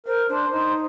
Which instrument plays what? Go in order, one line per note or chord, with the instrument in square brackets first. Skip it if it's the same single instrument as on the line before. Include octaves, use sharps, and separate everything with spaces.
[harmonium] A#4 [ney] C5
[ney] D4 [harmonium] C5
[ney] D#4 [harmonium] C5